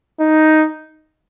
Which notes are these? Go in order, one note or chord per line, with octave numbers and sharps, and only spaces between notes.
D#4